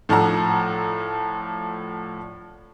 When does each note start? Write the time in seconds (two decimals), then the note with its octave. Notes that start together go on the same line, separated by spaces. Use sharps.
0.09 A2 F3 D4 F#5 A#5 E6